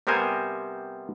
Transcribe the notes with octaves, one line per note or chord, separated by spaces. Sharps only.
C3 G3 B3 A#4 C5 G#5